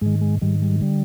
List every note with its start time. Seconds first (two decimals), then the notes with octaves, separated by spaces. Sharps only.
0.01 G#2 D#3 G#3
0.21 G#3
0.41 G#2 D#3 G3
0.62 G3
0.81 D3 G3